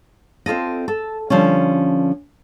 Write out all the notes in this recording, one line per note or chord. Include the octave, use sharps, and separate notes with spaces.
C4 F4 A4 D#5
A4
D3 F3 G3 C#4